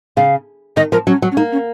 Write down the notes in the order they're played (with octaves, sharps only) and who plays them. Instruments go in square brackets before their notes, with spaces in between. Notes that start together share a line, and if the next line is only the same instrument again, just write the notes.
[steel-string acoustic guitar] C#3 [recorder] F5
[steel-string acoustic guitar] D#3 [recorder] D#5
[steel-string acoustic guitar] F3 [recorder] A#4
[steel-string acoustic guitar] F#3 [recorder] C#4
[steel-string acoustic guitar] F#3
[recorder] C#4
[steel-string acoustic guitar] A#3 [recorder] D#4
[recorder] C#4